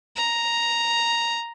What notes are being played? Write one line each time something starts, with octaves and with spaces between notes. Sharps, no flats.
A#5